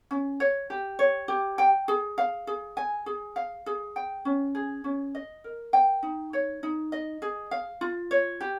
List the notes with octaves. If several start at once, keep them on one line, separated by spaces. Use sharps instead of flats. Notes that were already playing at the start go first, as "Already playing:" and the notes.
C#4
C#5
G4
C#5
G4
G5
G#4
F5
G#4
G#5
G#4
F5
G#4
G5
C#4
G#4
C#4
D#5
A#4
G5
D#4
C#5
D#4
D#5
G#4
F5
F4
C#5
G4